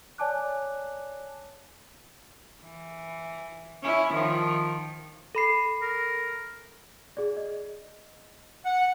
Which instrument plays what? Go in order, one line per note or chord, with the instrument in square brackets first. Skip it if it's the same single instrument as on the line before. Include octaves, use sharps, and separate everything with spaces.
[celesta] C#5 D5 G#5 A5 D6 F#6
[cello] E3
C#4 E4
D#3 F3
[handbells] A4 B5 C7
[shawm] A#4
[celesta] G#4 D5
D#5
[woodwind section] F#5